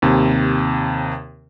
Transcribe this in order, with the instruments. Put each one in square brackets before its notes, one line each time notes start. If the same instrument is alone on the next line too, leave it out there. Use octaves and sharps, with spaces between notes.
[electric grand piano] D#2 C3